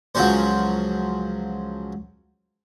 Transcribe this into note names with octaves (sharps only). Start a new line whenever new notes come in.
C#2 F3 F#3 C#4 C5